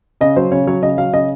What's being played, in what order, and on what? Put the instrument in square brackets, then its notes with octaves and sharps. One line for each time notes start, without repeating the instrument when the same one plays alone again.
[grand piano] C#3 D#5
F#3 C5
C#3 C#5
F#3 C#5
C#3 D#5
F#3 F5
C#3 D#5